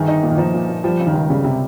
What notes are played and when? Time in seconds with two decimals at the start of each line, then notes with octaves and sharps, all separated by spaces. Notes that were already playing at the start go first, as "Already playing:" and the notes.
Already playing: G1 D#3 G#4
0.08 D#4
0.23 A#2
0.30 D#3
0.38 F3 D#4
0.54 A#2
0.69 A#2
0.84 F3 G3
1.00 C#3
1.06 D#3
1.14 C#2
1.30 C#3 G3
1.44 C3 G3